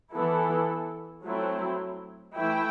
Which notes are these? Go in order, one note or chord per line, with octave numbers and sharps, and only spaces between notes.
E3 B3 E4 A4
F#3 A3 C4 E4
E3 A3 E4 G5